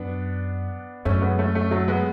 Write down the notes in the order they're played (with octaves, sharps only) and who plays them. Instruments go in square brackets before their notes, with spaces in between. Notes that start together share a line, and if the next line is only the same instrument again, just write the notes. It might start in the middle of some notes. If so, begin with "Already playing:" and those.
Already playing: [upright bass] F#2 [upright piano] B3 D4
[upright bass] F#2 [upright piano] A3 C#4
[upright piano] G#3 B3
A3 C#4
A3 C#4
F#3 A3
G#3 B3